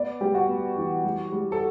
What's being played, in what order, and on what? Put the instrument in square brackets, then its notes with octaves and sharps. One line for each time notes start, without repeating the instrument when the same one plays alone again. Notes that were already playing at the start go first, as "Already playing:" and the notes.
Already playing: [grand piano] B3 [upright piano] D5
[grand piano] G3 [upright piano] G4
[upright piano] F#4
[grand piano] B3
E3
G3
G3
[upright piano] A4